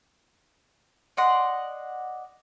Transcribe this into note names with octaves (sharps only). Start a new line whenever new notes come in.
D5 D#5 F#5 C6